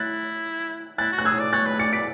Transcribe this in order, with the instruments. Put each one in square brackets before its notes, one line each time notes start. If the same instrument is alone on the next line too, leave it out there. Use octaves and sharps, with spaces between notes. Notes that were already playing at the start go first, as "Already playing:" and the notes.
Already playing: [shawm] E4 [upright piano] F#6 A6
[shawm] E4 [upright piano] F#6 A6
[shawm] F#4
[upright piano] F#6
[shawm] G#4 [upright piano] E6 G#6
[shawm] D5
[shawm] C#5 [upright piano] F#6 A6
[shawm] B4
[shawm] D5 [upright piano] A6 C#7
[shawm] D5 [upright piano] B6 D7